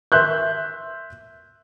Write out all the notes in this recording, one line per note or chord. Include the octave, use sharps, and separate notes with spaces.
E5 C6 F#6 G6